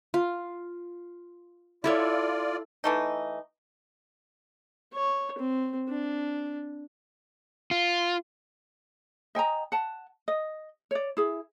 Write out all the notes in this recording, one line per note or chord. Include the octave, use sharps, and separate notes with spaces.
F4
E4 F4 A4 C#5 D5
E3 A3 D#4
C#5
C4
D4
F4
D#5 G5 G#5 A#5
F#5 A5
D#5
C#5 D5
E4 G#4